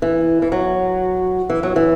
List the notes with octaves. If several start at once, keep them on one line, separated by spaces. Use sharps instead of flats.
E3
E3
F#3
E3
F#3
E3